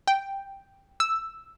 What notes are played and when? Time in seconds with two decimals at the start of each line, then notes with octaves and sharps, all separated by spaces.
0.08 G5
1.00 E6